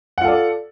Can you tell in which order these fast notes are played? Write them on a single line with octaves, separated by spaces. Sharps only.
F#5 F4 A4 D5